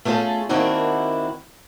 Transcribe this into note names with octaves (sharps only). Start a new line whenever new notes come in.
A3 B3 C#4 F4 G#4 A4
D#3 A#3 C4 D4 E4 F#4